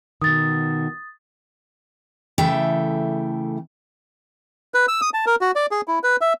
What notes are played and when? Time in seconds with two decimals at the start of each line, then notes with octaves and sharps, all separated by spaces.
0.22 B2 D#3 D#6 A6
2.38 C#3 E3 A3 A4 E5 G5
4.74 B4
4.88 E6
5.02 D#6
5.14 A5
5.26 A#4
5.41 F#4
5.56 D5
5.71 G#4
5.88 E4
6.04 B4
6.21 E5